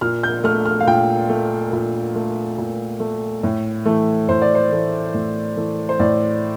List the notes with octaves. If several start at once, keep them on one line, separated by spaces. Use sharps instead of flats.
A#2 F6
G6
A3 F6
F6
F5
A#2 G5
A3
A#2
A3
A#2
A3
A2
E3 A3
A2 C5
D5
C5
E3 A3
A2
E3 A3
C5
A2 D5